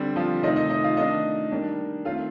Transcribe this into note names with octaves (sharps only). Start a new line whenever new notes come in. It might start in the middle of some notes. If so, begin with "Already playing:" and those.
Already playing: D3 G3 C4
F3 F4
C3 D#3 A3 C4 D#4 D#5
D#4 D#5
D#4 D#5
F4 F5
D#3 A3 D4 D#4 D#5
D#3 G3 A#3 D4
D#3 A3 C4 F4 F5